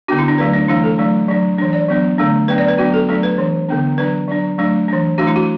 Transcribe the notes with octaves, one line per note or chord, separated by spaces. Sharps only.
D3 B3 D4 F#4
E4
D4
D3 F#3 A3 D4 B4
D4
E3 A3 D4 E4
A4
F#3 A3 D4
F#3 D4
E3 D4
D5
F#3 B3 D4
D3 A3 D4
F#3 B3 D4 B4
D5
B4
F#3 B3 D4 F#4
A4
F#3 A3 D4 A4
B4
E3 D4
D3 B3 D4
F#3 D4 B4
F#3 D4
F#3 A3 D4
E3 D4
E3 A3 D4 F#4
E4
F#4